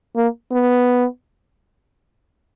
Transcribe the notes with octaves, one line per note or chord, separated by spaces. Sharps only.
A#3
B3